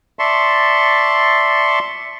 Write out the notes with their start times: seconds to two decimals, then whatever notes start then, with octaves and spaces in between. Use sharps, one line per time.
0.19 D5 E5 A5 C6 C#6